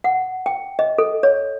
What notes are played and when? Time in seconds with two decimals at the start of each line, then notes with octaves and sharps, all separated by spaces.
0.04 F#5
0.46 G5
0.79 D#5
0.98 A4
1.23 C#5